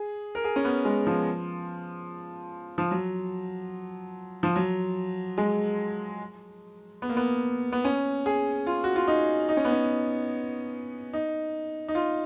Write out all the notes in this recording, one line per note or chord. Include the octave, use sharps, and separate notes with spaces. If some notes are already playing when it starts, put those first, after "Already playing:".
Already playing: G#4
A#4
G#4
C#4
B3
G#3
F3
F3
F#3
F3
F#3
G#3
B3
A#3
B3
B3
C#4
G#4
F4
F#4
F4
D#4
D#4
C#4
B3
C#4
D#4
D#4
F4